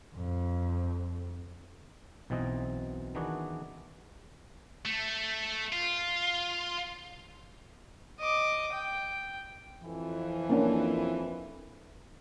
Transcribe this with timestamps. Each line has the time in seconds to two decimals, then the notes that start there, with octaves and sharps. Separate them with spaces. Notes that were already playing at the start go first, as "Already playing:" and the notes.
0.16 F2
2.30 B1 B2 E3 C4 D#5
3.15 D#3 E3 B3 D4 F#4 G#4
4.85 A3
5.72 F4
8.19 D#5 D6
8.74 G5
9.82 F2 E3
10.50 A#3 C#4 D4